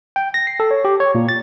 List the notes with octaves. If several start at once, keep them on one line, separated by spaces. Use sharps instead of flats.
G5
A#6
C7
A4
C#5
G4
C#5
A#2
A6